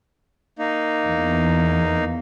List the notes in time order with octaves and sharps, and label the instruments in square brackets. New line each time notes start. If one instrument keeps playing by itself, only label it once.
[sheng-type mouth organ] A#3 D#4
[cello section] E2